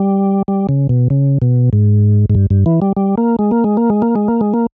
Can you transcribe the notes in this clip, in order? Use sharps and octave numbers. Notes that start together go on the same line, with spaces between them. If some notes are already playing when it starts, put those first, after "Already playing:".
Already playing: G3
G3
C#3
B2
C#3
B2
G#2
G#2
G2
G2
E3
G3
G3
A#3
G#3
A#3
G#3
A#3
G#3
A#3
G#3
A#3
G#3
A#3